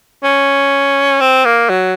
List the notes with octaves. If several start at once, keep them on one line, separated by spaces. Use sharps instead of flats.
C#4
C4
A#3
F#3